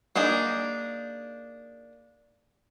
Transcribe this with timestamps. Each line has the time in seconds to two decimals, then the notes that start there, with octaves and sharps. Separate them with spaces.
0.15 A#3 D4 D#4 G#4